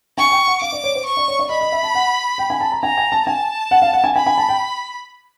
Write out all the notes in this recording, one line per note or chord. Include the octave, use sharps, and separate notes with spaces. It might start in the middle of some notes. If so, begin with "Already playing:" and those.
G#5 C#6
G5
F#5
F5 D6
D5
C#5
C5
C#6
D5
C#5
D5
D#5 B5
D#5
E5
A5
F#5
G5
G#5
A5
A#5
G#5 A#5
G#5
A5
G#5 A5
F#5
F5
F#5
G#5
G#5 B5
G#5
A5
G5